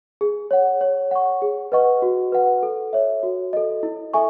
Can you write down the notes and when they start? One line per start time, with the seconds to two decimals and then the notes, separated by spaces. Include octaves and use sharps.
0.21 G#4
0.51 C#5 F#5
0.81 C#5
1.11 F#5 C#6
1.42 G#4
1.72 B4 D#5 F#5 C#6
2.02 F#4
2.32 B4 F#5
2.63 A4
2.93 C#5 E5
3.23 F#4
3.53 A4 D#5
3.83 E4
4.14 A4 E5 G#5 C#6